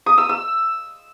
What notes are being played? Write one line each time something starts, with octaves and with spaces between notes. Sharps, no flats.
D#6
E6
E6